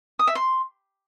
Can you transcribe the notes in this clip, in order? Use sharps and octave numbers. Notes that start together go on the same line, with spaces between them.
D#6
E5
C6